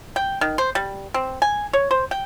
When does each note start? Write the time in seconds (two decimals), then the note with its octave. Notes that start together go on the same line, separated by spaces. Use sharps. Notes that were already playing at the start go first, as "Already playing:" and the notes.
0.16 G5
0.41 D#3
0.58 C5
0.75 G3
1.14 C4
1.42 G#5
1.73 C#5
1.91 C5
2.11 G5